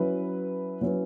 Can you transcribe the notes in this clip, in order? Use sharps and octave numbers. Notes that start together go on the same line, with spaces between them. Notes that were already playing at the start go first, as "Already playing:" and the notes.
Already playing: F#3 C#4 E4 B4
F#3 C#4 E4 B4